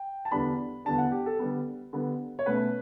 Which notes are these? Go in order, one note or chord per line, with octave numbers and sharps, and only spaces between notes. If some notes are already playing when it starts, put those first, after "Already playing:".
Already playing: G5
A5
E2 D3 G3 B3 D4 B5
E2 D3 G3 B3 D4 A5
F#5
G4
A4
D3 G3 B3
D3 G3 B3
C#5
B2 A3 C#4 B4